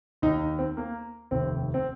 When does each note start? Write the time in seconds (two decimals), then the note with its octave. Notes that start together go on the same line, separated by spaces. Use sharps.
0.22 D#2 D#3 D#4
0.59 C4
0.77 A#3
1.31 F1 D#2 D#3 C4
1.74 C4